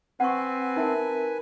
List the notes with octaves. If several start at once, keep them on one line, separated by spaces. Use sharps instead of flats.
C4 B4 F#5 G#5 C#6
D#4 A#4 E5 A5